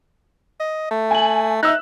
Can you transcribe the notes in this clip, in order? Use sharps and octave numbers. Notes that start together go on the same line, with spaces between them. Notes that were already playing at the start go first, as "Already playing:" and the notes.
D#5
A3
G#5 F#7
D#4 E5 E6 F#6